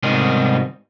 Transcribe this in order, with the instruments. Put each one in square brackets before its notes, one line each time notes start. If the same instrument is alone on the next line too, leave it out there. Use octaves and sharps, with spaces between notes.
[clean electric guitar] G#2 C3 D#3 G3 B3 G#4